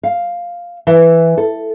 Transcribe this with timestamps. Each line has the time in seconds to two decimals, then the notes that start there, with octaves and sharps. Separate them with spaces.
0.03 F5
0.87 E3
1.37 A4